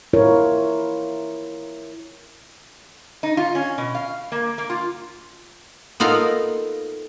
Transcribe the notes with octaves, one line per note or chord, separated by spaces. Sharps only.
E4 F4 A#4 C#5
D#4
F4
C#4
B2
F5
A#3
A#3
F4
B3 D#4 F4 A4 A#4